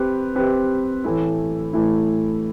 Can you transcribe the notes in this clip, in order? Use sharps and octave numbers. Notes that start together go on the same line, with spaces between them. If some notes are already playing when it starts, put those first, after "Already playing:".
Already playing: C4 G4 B4
C4 G4 B4
A2 E3 A3 E4
A2 E3 A3 E4